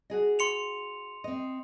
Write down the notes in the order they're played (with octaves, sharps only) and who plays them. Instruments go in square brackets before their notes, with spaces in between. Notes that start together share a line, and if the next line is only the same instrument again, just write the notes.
[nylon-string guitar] F#4 G#4 D#5
[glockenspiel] C6 C#7 F7
[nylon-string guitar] C4 D#5